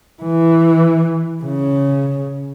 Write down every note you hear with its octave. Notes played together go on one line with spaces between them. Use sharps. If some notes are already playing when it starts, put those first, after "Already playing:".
E3
C#3